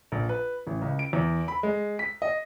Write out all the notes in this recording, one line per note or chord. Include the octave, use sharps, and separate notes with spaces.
A#1
B4
A1
C#2
D7
E2
B5
G#3
B6
D#5